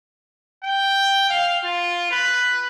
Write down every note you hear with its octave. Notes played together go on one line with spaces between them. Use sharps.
G5
F5
F4
B4